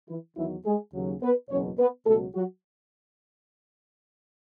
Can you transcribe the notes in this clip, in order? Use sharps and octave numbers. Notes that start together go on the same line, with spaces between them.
E3 E4
E2 D#3 E3 F#3 E4
G#3 G#4
D#2 C#3 F#3
B3 B4
F#1 E2 B2 F#3 C#4 C#5
B3 B4
C#2 B2 F#3 A3 A4
F#3 F#4